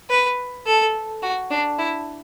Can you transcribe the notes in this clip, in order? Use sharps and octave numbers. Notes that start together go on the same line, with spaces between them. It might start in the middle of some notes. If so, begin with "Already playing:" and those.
B4
A4
F#4
D4
E4